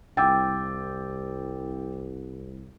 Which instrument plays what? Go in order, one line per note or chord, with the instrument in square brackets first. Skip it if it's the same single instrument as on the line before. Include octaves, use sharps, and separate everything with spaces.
[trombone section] C2 [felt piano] G5 [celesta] D6 E6 A6